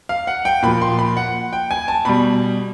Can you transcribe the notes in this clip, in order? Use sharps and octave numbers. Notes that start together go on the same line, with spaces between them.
F5
F#5
G5
A#2 F3 B5
C6
B5
F#5
G5
G#5
A5
B2 G3 B5